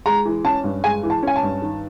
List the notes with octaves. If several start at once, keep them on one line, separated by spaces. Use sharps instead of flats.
G#3 A#5
E3
C#4 A5
G2
G#3 G#5
E3
A5
C#4 G#5
A5
G2
D#3